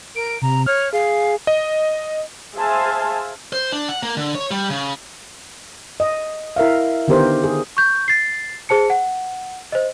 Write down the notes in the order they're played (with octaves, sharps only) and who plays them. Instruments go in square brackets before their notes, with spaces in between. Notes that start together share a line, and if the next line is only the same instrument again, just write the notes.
[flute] A#4 [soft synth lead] D7
[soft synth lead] C3 [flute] A#5
[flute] C#5 [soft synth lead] F6
[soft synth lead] G#4 [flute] F5
[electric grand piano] D#5
[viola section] G#4 C5 E5 F5 G#5 A5
[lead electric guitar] C5
D4
F#5
A#3
D3
C#5
G3
C#3
[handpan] D#5
E4 A#4 E5 F5
D3 D#3 B3 G4 A#4 C5
G#4
[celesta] C#6 G6
A6 C7
G#4 C5 A5 C#7
F#5
C5 D#5